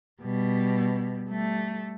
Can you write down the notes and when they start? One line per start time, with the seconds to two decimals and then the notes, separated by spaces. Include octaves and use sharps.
0.21 B2 G3
1.29 G3 A3